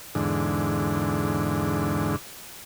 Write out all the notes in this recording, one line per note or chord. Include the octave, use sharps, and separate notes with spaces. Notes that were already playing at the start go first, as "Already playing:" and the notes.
E2 G#2 D3